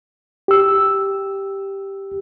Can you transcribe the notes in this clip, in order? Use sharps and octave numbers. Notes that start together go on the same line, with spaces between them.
G4 E6